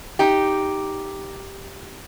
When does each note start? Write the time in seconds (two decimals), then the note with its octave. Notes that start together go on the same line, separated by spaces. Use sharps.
0.19 D#4 G4